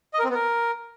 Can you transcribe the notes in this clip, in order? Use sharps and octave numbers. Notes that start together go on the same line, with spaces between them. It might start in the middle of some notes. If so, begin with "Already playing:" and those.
D#5
A#4
C4
B3
A#4